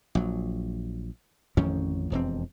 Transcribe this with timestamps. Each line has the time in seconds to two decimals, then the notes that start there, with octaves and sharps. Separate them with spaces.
0.15 A#1 F#3
1.57 A1 F2 D#3 C#4
2.12 E1 F2 C4